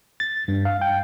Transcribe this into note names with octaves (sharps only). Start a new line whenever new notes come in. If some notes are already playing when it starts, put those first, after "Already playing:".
A6
G2
F5
G5